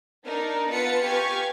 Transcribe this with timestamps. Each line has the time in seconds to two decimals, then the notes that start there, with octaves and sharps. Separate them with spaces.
0.25 D4 D#4 A#4
0.71 B3 F4 B4 A5 A6 C#7
1.05 G4 B4 F5 G#5 C#6